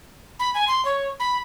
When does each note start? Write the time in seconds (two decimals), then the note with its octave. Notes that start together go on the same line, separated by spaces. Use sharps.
0.39 B5
0.54 G#5
0.68 C6
0.85 C#5
1.20 B5